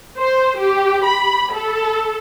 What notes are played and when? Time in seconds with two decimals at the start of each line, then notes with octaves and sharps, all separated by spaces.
0.18 C5
0.58 G4
1.05 B5
1.53 A4